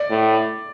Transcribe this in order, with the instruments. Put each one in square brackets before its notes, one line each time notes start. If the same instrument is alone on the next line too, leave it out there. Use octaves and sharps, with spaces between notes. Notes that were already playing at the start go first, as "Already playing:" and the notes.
Already playing: [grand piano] D5
[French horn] A2